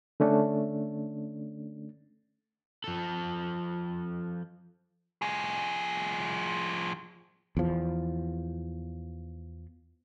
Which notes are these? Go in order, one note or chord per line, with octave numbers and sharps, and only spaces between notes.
D3 A3 C#4 D4
F3 A4
F3 G#4
E2 F3